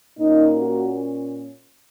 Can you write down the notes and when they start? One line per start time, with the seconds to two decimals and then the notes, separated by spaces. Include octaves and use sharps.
0.18 A#2 A#3 C#4 D#4
0.57 F#4